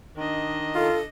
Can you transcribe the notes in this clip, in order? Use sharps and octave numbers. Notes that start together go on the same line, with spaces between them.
D#3 D4 D#5
F4 A4